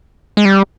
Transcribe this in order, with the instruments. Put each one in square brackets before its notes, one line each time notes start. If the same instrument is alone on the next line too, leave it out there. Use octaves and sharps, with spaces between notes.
[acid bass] G#3
G3